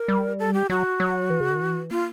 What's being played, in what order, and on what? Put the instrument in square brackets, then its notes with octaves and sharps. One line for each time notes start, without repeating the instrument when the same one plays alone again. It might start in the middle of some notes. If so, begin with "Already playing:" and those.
Already playing: [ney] A#4
[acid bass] G3
[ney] A4
G4
[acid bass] F#3 [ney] F#4
[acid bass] F#3
E3
C#3
D3
D#3
E3
[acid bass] A#3 [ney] F4